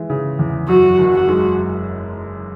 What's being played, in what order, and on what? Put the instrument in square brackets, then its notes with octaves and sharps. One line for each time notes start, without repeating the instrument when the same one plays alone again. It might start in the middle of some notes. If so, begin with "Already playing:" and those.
Already playing: [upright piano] E3 G#3
C#3
E2
[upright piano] F#2 [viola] F#4
[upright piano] F#1
[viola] F#4
[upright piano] G#3